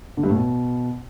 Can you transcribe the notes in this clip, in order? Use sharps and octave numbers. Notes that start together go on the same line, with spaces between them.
D3
G2
A2
B2